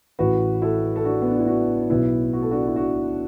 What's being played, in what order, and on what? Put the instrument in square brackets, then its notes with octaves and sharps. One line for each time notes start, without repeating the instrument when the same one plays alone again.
[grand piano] A1 A2 E3 F#4 B4
E4 A4
A4
D4 F#4
B3
D4
E4
D4 F#4
B1 B2 F#3 B3 E4
F#4
A4
D4 F#4
E4
D4 F#4